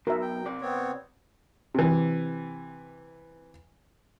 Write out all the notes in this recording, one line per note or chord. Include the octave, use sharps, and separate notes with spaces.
B2 F#3 A#4 E5
G5
C3 D5
B3 C4 C#5
C3 E3